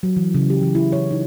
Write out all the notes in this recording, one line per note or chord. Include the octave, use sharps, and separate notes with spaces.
F#3
E3
C#3
G4
E3
E4
C#5
D#4